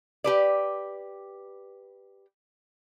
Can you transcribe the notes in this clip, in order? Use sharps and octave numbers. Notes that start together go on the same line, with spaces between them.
G4 B4 D5